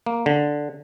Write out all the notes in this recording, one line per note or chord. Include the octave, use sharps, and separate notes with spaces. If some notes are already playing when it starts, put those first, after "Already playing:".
A#3
D3